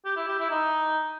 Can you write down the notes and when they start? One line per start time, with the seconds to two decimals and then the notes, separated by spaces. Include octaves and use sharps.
0.05 G4
0.17 E4
0.28 G4
0.39 E4
0.50 D#4